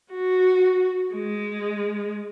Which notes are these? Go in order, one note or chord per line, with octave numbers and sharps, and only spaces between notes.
F#4
G#3